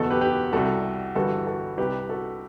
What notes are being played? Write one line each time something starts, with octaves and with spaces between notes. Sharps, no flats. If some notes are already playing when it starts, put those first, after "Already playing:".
Already playing: F#1 E2 B2 F#4 A4
G4 B4
G4 B4
C2 C3 G3 F#4 A4
G1 G2 E3 G3 F#4 A4
F#4 A4
C2 C3 G3 G4 B4
F#4 A4